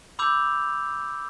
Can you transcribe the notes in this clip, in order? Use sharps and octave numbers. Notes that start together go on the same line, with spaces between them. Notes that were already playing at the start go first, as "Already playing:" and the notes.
B5 D6 E6 G6 F7